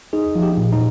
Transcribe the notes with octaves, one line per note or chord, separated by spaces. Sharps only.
D#4 G#4
F3
G4
A#2
D#4